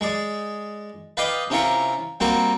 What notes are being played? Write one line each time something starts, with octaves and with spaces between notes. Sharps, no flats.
G#3 G#4 D5
B4 D5 D#5 F5 G5
C3 C#4 E4 F4 A#4 C#6
G3 A#3 C4 F#4 A#4 C5